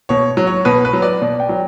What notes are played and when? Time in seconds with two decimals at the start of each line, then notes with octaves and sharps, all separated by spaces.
0.09 B2 C#5
0.37 F#3
0.47 C#5
0.65 B2 B4
0.85 B4
0.93 F#3
1.02 D5
1.22 B2 D5
1.40 G5
1.49 F#3